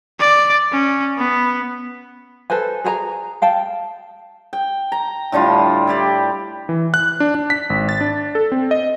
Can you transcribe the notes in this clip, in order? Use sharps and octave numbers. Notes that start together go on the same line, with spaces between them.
D5
C#4
B3
A4 B4 C5 G#5
G#4 A4 G#5 A#5
F5 G5 A5
G5
A#5
A2 D3 G3 F4
E4 G4 D5
E3
F#6
D4
D4
B6
G#1
A6
D4
A4
C4
D#5